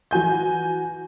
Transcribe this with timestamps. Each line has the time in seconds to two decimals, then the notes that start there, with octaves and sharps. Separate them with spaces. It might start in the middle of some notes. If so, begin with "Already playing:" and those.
0.11 E3 F#4 G#5 G6